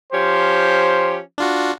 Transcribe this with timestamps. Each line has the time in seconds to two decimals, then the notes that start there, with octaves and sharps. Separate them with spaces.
0.12 F3 C#4 G4 C5
1.38 D4 F4 F#4